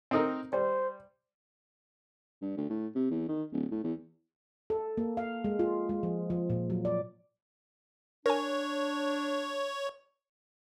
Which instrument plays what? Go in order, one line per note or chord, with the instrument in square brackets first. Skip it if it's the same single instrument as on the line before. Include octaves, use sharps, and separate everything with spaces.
[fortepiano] C4 D#4 A#4
[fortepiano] G3 [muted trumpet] C5
[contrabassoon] G2
D2
A2
C3
E2
D#3
D1
A2
E2
[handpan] A4
A#3
F5
G#3
F4
G#3
F3
F3
A#2
F#3
D5
[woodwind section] D4 [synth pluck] A#4 G#5 [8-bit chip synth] C#5